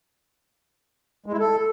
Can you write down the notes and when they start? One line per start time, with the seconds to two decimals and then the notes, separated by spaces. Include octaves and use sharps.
1.26 G#3
1.33 E4
1.39 A4